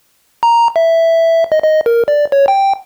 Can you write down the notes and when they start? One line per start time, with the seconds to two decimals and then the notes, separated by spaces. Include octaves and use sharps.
0.43 A#5
0.76 E5
1.52 D#5
1.63 D#5
1.86 A#4
2.08 D5
2.32 C#5
2.48 G5